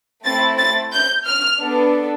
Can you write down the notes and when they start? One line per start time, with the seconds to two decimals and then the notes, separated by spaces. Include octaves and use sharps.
0.25 A3 C4 E4 A6
0.58 A6
0.93 G6
1.26 F6
1.60 B3 D4 A4